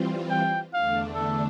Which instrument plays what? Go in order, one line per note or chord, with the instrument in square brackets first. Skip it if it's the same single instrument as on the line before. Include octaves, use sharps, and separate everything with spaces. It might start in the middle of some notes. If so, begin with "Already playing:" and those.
Already playing: [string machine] E3 G3 C4 F4
[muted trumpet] G5
[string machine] E2 D3 A3 D4 [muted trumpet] F5
[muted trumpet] A4